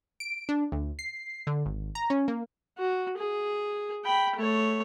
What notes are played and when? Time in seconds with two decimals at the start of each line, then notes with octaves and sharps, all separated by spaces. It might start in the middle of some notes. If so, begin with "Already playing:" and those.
0.20 D7
0.49 D4
0.72 D2
0.99 C7
1.47 D3
1.65 G#1
1.95 A#5
2.10 C#4
2.28 A#3
2.78 F#4
3.17 G#4
4.04 G5 B5
4.36 A3 C#5